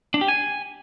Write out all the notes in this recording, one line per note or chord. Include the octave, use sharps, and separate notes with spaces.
D4
G4
G#5